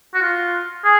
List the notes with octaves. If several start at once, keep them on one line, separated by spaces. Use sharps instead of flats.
F#4
F4
G#4